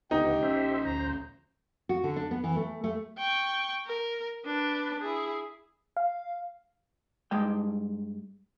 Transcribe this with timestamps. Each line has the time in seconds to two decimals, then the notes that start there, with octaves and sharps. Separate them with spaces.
0.11 D1 C#2 D3 B3 D#4 G4
0.43 A#1 F3 C#4 C5 E5
0.85 D2 C5 A#5
1.89 F#4
2.04 D3
2.16 D4
2.31 B3
2.44 E3
2.56 A3
2.84 A3
3.18 G5 C#6
3.86 A#4
4.45 D4 B4
5.00 E4 G#4
5.97 F5
7.31 G2 G#3 G5